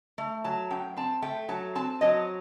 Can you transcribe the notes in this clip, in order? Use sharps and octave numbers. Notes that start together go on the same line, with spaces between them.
A3
F#3 A5
F#2 G5
C4 A5
A3 G5
F#3 A5
C4 A5
F#3 D#5